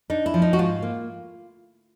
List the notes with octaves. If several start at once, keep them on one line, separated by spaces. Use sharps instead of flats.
D4 D#4
E4
F3
D#4
F#4
G#2 F4
A#3